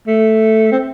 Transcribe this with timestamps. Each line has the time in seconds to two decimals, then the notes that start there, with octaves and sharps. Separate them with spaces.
0.07 A3
0.72 C4